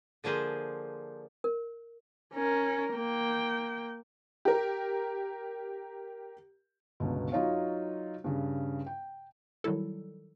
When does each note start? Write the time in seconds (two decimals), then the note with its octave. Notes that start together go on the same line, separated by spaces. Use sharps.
0.24 D3 F3 A#3 G#4 C5
1.44 A#4
2.34 C#4 A#4
2.94 A#3 G5
4.45 G4 A#4
7.00 G1 C#2 B2
7.32 F#3 D#4 F4 C#5 F5
8.24 G2 C#3
8.86 G5
9.64 D#3 F#3 G3 E4 A4